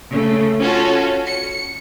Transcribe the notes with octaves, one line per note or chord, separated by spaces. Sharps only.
C#3 A3
C#4 F4 F#4 A4
C#7